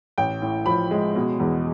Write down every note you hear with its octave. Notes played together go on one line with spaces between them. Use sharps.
A1 G5
A2
F3 B5
G#3
B2
E2